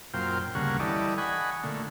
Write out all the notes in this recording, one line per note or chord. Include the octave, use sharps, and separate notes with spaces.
F#2 A#2 F4 C5 G5
D2 G2 C#3 A#3 F#5 C#6
E3 G3 A4 D5 D#5
D#5 F#5 G#5 B5 C#6
A#2 D3 A3